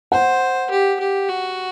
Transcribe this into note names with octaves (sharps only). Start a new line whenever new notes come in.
C5 F#5
G4
G4
F#4